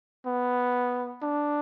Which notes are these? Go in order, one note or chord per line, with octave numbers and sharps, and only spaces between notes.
B3
D4